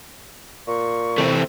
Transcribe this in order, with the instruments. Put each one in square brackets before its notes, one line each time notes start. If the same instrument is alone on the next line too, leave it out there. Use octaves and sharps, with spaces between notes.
[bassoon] A#2 [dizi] C#6
[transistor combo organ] C3 E3 [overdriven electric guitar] A3 C4